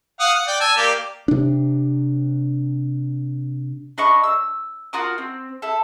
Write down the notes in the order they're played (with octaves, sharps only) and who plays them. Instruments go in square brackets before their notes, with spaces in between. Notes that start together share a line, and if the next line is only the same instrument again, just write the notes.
[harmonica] F5 F#5 D#6
F#5
D5 G5
G#5 A5 E6
A#3 G4 D5
[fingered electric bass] C3 D4
[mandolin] D4 D#5 B5 C#6
E6
F4 F#4 A#4 D#6
C4
E4 A4